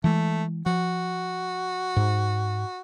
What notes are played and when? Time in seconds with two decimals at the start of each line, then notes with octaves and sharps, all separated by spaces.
0.04 E3 G#3 A3
0.66 F3 F#4
1.96 G#2